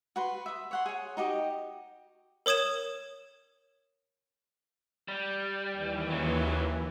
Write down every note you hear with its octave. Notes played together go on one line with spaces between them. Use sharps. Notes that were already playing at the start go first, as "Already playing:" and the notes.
F#4 B4 C6
E5 D#6
C#5 F#5 C6
G#4 C#5
D#4 F#4 G4 D#5
A#4 C#5 D#6 G#6 E7
G3
D#2 E3
C#3 F#3